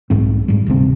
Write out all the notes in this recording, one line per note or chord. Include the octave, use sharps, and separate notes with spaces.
B1 G#2 C4
G#2 G3
E1 D2 C3 C4